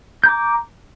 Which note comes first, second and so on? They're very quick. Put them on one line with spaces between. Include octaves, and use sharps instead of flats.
G6 A#5 D6